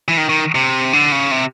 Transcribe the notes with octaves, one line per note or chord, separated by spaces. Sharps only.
E3
D#3
D#3
C3
D3
C#3
C3